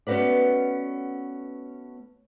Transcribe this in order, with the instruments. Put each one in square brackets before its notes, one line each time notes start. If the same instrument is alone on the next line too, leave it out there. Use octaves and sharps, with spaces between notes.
[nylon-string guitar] A3 B3 C#4 F#4 B4 D5